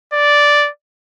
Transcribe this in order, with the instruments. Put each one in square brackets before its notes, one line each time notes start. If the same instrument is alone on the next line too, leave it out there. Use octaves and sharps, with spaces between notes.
[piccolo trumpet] D5